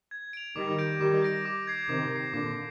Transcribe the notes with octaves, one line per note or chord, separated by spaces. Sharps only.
G#6
D7 F7
D#3 G3 D6
G6 A#6 D7
D#3 G3 D6
G6 A#6 D7
D6
G#6 C7
C3 D#3 D6
G#6 C7
A#2 D3 D6